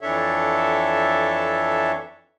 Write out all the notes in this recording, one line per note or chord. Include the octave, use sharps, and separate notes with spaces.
F2 E3 D4 A4 C#5 E5